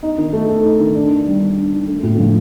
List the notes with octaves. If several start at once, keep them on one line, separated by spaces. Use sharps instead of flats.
D#4
D#3
A3
A4
D#4
D#3
D4
D#3
G3
D#3
D4
D#3
A3
A2
F3